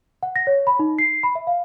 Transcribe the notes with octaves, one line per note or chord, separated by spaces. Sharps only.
F#5
A#6
C#5
B5
D#4
C7
B5
E5
F5